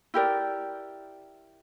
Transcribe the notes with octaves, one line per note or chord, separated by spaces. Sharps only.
E4 G4 A#4 D5